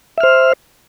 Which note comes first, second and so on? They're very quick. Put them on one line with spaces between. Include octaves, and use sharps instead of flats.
E5 F6 C5